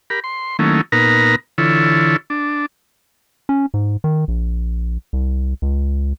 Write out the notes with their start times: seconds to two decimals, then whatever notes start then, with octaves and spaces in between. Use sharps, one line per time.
0.10 G4 A#4 B5
0.24 C6
0.59 D#3 F#3 A3 A#3 C#4 E4
0.92 A#2 B3 D#4 A#4 B4 A#5
1.58 D3 E3 E4 F4 A4 C#5
2.30 D4
3.49 C#4
3.74 G#2
4.04 D#3
4.28 A#1
5.13 C2
5.62 C#2